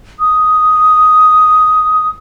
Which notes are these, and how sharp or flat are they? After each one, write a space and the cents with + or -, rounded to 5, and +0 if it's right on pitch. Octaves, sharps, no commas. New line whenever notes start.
D#6 +5